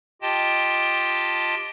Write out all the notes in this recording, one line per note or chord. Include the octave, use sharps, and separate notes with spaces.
F4 G4 D#5 G5 A5